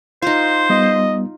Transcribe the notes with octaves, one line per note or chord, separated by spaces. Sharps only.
D#4 F4 C5
G3 B3 D#5